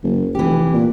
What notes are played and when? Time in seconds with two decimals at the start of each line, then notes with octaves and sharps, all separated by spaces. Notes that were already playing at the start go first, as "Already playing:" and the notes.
0.03 F#1
0.35 F1 E3 G4
0.73 A#2